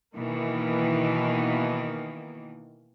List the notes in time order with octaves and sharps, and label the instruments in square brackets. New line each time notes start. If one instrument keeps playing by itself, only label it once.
[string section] B2 D#3 E3 A#3